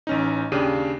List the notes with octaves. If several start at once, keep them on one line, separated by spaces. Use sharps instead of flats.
A1 C#4 D#4
D#2 C#3 D4 G4 D#7